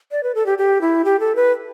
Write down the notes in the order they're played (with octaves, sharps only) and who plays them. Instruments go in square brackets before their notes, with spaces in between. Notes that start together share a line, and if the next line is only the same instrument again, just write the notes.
[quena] D5
B4
A4
G4
G4
E4
G4
A4
B4